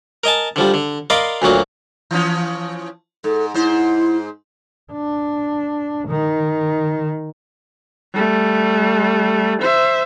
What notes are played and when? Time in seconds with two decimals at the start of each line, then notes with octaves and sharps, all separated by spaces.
0.24 A#4 D#5 G#5 A5
0.56 D3 F3 G3
0.74 D3
1.10 A#4 D5 D#5 F5 B5 C6
1.42 D2 A#2 F#3 A#3
2.11 E3 F3 C#4
3.24 G#2 A4
3.54 G#2 E4 C5
4.92 D4
6.08 D#3
8.14 G3 A3
9.62 C5 E5